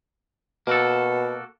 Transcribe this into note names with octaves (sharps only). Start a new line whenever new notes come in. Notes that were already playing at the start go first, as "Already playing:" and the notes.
B2 A#3 F#4 A4